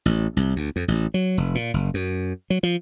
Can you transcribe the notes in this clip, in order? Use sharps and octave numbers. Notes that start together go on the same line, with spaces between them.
A1
C2
D2
F2
A1
F#3
F1
A#2
F#1
F#2
F#3
F3